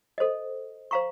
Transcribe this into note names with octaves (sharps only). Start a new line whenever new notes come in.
A4 C5 D#5
C5 F5 A#5 C#6